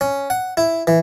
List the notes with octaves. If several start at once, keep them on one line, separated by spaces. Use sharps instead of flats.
C#4
F#5
E4
E3